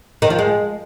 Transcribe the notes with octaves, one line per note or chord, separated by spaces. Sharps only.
D#3
F3
G#3